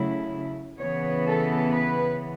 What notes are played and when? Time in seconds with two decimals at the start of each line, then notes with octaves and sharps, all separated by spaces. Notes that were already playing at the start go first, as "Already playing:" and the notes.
Already playing: C#3 F#3 A3 E4
0.79 C#3 E3 B3 C#5
1.25 A4
1.70 B4